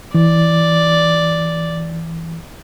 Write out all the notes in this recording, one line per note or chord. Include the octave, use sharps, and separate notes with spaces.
E3 D5